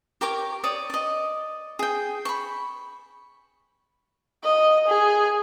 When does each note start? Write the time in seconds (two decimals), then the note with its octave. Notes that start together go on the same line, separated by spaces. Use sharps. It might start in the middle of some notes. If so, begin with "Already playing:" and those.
0.21 G4 A#4 C#5 D6
0.64 C#5 D5 C#6 D#6
0.90 D5 D#5
1.79 G#4 G5
2.25 B5 C#6
4.44 D#5
4.88 G#4